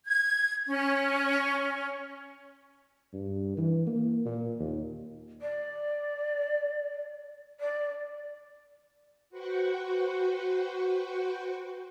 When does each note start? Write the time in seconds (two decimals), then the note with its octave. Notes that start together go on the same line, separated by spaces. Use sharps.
0.06 G#6
0.68 C#4
3.13 G2
3.57 E3
3.87 A#3
4.25 A#2
4.59 D#2
5.41 D5
7.60 D5
9.30 F#4 B4 C5 F#5 G5 C#6